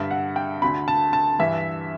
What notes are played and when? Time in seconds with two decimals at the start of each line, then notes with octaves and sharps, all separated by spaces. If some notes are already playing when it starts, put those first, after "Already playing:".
Already playing: G2 D3 E5
0.11 F#5
0.36 G5
0.62 D2 D3 B5
0.88 A5
1.13 A5
1.39 G2 E3 E5